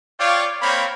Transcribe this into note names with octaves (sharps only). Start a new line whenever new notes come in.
F4 C#5 D5 F5 G5
A#3 C4 C#5 B5